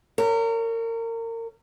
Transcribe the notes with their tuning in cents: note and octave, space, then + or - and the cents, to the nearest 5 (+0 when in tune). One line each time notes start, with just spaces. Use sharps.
A#4 -30 C#5 +15